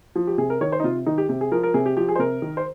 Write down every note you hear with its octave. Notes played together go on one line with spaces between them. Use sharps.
F3
G4
C3 G#4
A#4
D#3 C#5
C5
D#4
C3 F4
D#3 D#4
G4
C3 G4
G#4
F3 A#4
A#4
C3 G#4
G4
F3 G4
G#4
C5
C3 A#4
D#3
C5